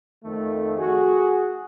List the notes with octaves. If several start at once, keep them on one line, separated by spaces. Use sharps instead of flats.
F2 D#3 A3
F#4 G#4